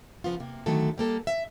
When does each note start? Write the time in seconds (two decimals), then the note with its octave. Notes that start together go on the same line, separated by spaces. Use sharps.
0.24 C#3 F3 B3 F4
0.40 C3 A#3
0.66 D3 D#3 F#3 A3 A4
0.98 G3 A#3 A4
1.27 E5